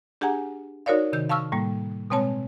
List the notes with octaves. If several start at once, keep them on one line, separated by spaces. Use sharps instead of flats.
D4 G4 G#4 F#5 G#5 A#5
D#4 F#4 A#4 C#5 D5 F5
C3 D#3 G6
F5 A5 C#6 E6 F6
A2 G3 A#3
B2 G#3 C4 C#5 A5